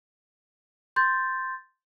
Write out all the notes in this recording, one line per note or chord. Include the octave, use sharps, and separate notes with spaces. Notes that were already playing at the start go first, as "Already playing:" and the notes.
C6 G6 A6